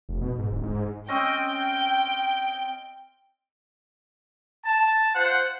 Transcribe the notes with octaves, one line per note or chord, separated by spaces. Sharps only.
F1
B2
G#2
D1
G#2
C4 C#4 D#5 G5
A5
F4 C5 F#5